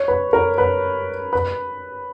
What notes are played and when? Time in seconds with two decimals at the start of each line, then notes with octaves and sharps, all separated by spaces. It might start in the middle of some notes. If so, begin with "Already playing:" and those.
Already playing: C#5
0.08 B4
0.33 A#4
0.58 B4
1.33 B4